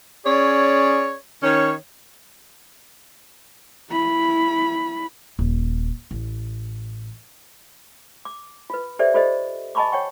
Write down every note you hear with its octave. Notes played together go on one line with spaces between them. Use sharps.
C#4 G#4 C#5 D5
D#3 C#4 C#5
E4 B5
D#1
A1
D6
F4 B4
G4 A4 C5 D5 E5
F4 G4 A4 C5 D5 D#5
D#5 G#5 A5 B5 C#6 D6
C#5 F#5 G5 C#6